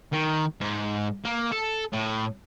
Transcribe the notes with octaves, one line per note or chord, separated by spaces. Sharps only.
D#3
G#2
A#3
A4
A2